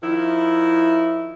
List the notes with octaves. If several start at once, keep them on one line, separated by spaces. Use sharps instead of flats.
D#3 F3 E4